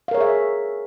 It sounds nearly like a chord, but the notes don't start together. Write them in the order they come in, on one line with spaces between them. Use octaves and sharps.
F5 A#4 C#5 G#4 E5